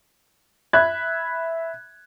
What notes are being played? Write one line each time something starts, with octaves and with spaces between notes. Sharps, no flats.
E5 B5 F#6 G#6